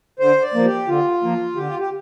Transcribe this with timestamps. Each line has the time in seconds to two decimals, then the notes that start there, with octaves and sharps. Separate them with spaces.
0.20 D3 C5
0.42 D5
0.54 F3 A#3
0.65 G4
0.88 D3 F4
1.22 F3 A#3
1.56 D3 G4
1.68 F4
1.79 G4